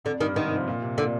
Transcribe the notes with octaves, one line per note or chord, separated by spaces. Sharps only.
F2 D3
G2 D#3
G#2 D#3
C3
F3
A#2
C3
A#2 D3